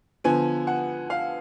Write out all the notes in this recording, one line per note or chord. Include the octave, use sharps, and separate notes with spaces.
D3 F3 B3 G#5
F#5
F5